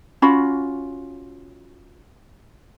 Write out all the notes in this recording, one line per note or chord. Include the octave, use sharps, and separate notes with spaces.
C#4 F4 F#4 B5